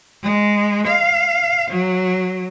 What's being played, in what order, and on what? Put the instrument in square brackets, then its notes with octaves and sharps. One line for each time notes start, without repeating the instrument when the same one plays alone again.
[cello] G#3
F5
F#3